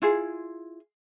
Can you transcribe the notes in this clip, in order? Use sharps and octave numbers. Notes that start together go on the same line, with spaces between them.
E4 F4 G#4